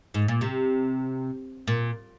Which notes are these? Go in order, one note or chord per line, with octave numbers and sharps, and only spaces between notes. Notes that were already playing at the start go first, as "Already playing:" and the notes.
G#2
A#2
C3
A#2